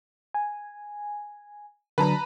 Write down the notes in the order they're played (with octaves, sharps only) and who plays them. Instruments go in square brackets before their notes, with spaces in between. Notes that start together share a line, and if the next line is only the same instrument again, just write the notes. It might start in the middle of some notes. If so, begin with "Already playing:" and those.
[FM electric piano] G#5
[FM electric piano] D3 F#3 D4 [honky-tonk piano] B4 A5 A#5